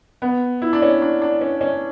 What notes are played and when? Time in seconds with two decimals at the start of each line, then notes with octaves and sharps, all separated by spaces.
0.22 B3
0.62 E4
0.73 D4
0.82 C#4
1.02 D4
1.21 D4
1.41 C#4
1.61 C#4